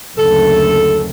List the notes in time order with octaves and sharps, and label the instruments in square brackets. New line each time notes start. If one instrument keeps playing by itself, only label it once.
[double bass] F#1 D2 [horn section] A4